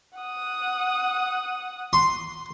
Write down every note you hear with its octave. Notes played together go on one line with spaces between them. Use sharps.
F#5 D#6
C6